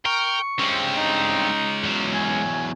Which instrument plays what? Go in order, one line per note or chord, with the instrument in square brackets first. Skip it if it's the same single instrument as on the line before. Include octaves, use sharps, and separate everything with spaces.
[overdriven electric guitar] A#4 [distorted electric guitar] G5 [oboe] C#6
[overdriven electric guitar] G2 C4 [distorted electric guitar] G#3 C#4
[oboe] D#4
[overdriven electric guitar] E2 F#3
[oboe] G#5